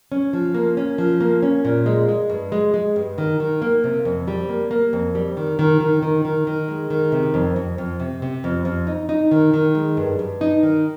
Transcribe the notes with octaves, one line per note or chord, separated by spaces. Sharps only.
C#4
F3
A#3
C#4
F3
A#3
C#4
A#2
G#3
G#3
G2
G#3
G#3
G2
D#3
D#3
A#3
C3
F2
G3
A#3
A#3
F2
G3
D#3
D#3
D#3
D#3
D#3
D#3
G#3
D#3
C3
F2
F2
F2
C3
C3
F2
F2
D#4
D#4
D#3
D#3
G#3
G2
G2
D#4
D#3